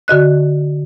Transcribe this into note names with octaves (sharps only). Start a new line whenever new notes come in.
D3 F#4 D#5 F#6